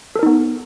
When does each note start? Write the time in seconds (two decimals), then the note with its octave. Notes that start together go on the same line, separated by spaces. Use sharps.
0.16 A4
0.19 A#4
0.23 D#4
0.26 B3